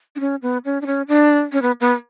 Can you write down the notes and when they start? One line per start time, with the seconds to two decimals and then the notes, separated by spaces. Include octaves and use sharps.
0.16 D4
0.20 C#4
0.42 B3
0.65 C#4
0.81 D4
0.87 C#4
1.08 D4
1.52 C#4
1.62 B3
1.81 B3